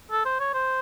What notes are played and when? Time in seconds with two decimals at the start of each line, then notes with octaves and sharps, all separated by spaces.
0.11 A4
0.25 C5
0.40 C#5
0.54 C5